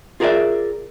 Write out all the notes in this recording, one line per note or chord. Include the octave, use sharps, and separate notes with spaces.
F4 G#4 A#4 C#5 D5 E5